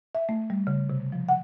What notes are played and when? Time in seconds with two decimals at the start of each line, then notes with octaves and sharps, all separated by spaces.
0.15 E5
0.29 A3
0.50 G3
0.67 C#3
0.90 C3
1.12 F3
1.29 F#5